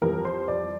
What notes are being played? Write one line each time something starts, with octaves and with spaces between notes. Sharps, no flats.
F2 E3 G3 A#4
C5
D5